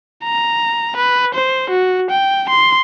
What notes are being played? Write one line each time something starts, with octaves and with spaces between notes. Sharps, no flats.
A#5
B4
C5
F#4
G5
C6